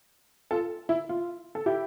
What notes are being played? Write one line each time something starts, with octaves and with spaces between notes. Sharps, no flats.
F4 A4
E4
F4
A4
E4 G4